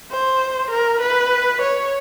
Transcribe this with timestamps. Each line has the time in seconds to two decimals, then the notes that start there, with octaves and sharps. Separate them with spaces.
0.11 C5
0.71 A#4
1.01 B4
1.62 C#5